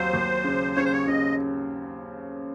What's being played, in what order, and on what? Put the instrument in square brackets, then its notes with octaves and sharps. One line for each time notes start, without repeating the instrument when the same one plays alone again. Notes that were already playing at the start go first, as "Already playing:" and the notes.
Already playing: [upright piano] D#2 F#3 C4 [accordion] C5
[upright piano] D#2
C#3
[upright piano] C#3 [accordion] C#5
[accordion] C5
C#5
[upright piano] C#3 [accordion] D#5